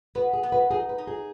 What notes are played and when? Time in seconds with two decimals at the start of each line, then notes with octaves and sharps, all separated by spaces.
0.15 B3 B4
0.33 G#4
0.43 B3
0.52 B4
0.71 D#4 G#4
0.89 B4
0.98 D#4
1.07 G#4